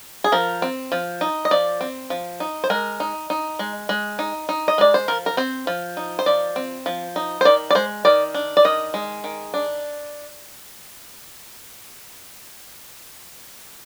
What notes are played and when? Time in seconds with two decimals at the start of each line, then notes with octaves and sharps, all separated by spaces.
0.24 G#4
0.32 F3 A#4
0.62 C4
0.92 F3
1.21 D#4
1.45 D#5
1.51 F3 D5
1.81 C4
2.10 F3
2.40 D#4
2.64 C5
2.70 G#3 A#4
3.00 D#4
3.30 D#4
3.59 G#3
3.89 G#3
4.19 D#4
4.49 D#4
4.68 D#5
4.78 G#3 D5
4.94 C5
5.08 F3 A#4
5.26 A#4
5.37 C4 C5
5.67 F3
5.97 D#4
6.19 C5
6.26 F3 D5
6.56 C4
6.86 F3
7.16 D#4
7.41 C5
7.45 D#3 D5
7.70 D5
7.75 G#3 C5
8.05 D#3 D5
8.34 D4
8.57 D5
8.65 D#3 D#5
8.94 G#3
9.24 D#3
9.54 D4